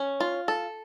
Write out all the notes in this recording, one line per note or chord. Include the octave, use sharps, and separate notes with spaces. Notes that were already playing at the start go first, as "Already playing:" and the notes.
Already playing: C#4
F4
A4